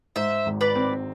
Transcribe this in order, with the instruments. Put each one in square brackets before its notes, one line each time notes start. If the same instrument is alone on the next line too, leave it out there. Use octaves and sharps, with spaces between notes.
[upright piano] G#2 [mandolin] C5 E5
[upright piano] G#1
[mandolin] B4 D5
[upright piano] C4